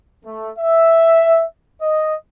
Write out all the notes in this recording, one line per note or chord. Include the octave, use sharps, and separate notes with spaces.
A3
E5
D#5